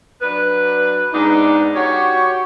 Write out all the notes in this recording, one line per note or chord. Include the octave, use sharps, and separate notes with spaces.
F#3 D4 B4
G#2 B3 D4 D#4
F#4 G4 C#5